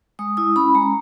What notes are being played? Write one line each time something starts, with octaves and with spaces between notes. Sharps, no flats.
G#3 D#6
E4 D#6
C#4 B5
G#3 A#5